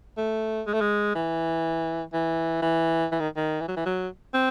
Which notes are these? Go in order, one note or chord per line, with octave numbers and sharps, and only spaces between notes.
A3
G#3
A3
G#3
E3
E3
E3
E3
D#3
D#3
E3
F#3
E3
F#3
C4